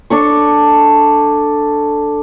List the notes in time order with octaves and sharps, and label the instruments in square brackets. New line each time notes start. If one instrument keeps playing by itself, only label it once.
[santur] D4 A4 C#6